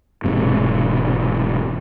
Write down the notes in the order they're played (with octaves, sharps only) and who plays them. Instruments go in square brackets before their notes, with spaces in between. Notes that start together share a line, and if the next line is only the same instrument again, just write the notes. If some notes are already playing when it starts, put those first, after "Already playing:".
[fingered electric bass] E1 G#2 C3